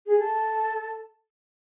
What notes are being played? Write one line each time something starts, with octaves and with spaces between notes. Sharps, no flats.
G#4
A4